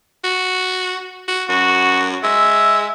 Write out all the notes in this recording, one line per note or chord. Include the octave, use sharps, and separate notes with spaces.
F#4
F#4
F#2 F#4
G#3 E5